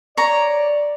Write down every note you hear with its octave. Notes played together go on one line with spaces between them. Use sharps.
C#5 D5 A#5